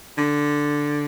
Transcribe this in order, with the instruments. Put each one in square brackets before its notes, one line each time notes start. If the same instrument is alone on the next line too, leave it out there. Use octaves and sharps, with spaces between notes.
[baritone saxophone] D3